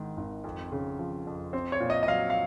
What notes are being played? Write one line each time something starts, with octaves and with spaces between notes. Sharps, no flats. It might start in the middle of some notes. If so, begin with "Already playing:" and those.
Already playing: G#1 G#2 D#3
G#1
F2
C#3
F3
F2
C4
C#5
A#2
D#5
D#5
F#3 F5
F5